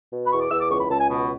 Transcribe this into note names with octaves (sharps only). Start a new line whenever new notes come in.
B2
B5
E2 C#6
D6
E2 E6
D6
C#2 C#6
B5
C#2 A5
G#5
B2